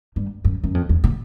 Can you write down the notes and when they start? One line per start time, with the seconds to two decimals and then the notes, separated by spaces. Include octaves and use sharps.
0.16 G2
0.45 F#2
0.64 F#2
0.75 F2
0.89 E2
1.04 A#2